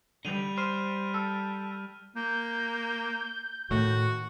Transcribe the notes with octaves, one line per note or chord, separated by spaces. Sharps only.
D3 G3 D#7 F7
C5 F6 D#7
A4
A#3 G6
A2 D#3 A3 F#4